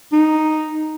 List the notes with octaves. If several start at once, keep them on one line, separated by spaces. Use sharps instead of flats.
D#4